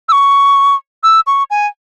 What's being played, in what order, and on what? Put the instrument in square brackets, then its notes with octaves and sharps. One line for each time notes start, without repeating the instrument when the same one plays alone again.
[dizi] E6
C#6
E6
C#6
G#5